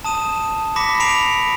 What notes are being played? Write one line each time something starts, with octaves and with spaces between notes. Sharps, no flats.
A5 D#6 D#7 E7
B5 D6 A#6 B6 C#7 E7
A#5 C7 D7 F7